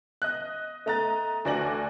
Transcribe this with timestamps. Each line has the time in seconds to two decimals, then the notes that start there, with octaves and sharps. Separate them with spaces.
0.22 D#5 F#6
0.86 A3 D#5 A#5 F#6 A6
1.45 D2 F#4 D5 G#5 A#6 F#7